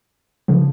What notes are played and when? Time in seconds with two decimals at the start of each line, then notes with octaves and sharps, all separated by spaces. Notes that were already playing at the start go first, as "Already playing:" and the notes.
0.48 C#3 F3